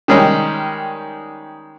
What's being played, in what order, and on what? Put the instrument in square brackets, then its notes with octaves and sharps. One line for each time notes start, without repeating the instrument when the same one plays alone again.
[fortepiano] D#3 G3 G#3 C#4 D#4